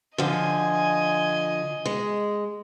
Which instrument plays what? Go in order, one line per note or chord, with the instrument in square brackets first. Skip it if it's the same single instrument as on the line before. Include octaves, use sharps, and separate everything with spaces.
[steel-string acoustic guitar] D3 F3 [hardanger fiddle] D#5 G#5
[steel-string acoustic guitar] G#3